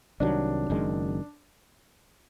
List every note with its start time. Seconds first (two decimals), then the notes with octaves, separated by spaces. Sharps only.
0.20 C2 C3 D#3 F#3 D4
0.70 F#1 F#2 D#3 G#3